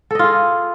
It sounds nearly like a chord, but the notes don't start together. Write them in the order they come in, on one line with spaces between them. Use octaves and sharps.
A4 D#5 F4 G#4